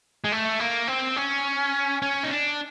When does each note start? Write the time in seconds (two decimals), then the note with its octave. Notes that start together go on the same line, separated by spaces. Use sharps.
0.24 G#3
0.32 A3
0.60 A#3
0.88 C4
1.17 C#4
2.02 C#4
2.24 D#4
2.31 D4